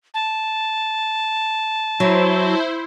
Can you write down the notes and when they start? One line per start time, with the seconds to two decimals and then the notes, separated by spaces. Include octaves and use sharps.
0.14 A5
2.00 F#3 E4 C5